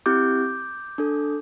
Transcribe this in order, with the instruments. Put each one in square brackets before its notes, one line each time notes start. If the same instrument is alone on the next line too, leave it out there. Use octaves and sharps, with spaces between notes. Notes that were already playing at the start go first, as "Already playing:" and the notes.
[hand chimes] C4 E4 G4 D6 G6
D4 A4